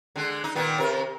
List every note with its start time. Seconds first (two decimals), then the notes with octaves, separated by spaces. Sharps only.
0.16 D3 G#3
0.44 D#4
0.55 A#2 D#3 B3
0.78 C3 A#4